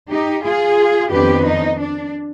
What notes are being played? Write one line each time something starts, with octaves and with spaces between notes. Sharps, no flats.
D#4 G4
F4 G#4
F2 D#3 B3 D4 G4 B4
D#4
D4